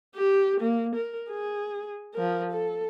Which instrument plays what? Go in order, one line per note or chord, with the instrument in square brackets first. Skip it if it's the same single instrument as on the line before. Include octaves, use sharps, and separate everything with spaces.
[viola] G4
A#3
A#4
G#4
F3 A#4
A4